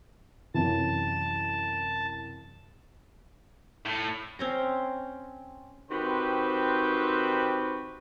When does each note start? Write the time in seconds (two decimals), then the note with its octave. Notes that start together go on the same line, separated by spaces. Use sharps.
0.54 F#2 C3 E3 A5
3.86 A2
4.39 C4 C#4 A#5
5.91 D#3 C4 F#4 G4 B4 C5